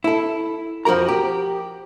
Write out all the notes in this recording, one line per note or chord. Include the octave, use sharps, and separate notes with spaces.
E4 A4
F2 F3 F#4 A#4 A#5
G4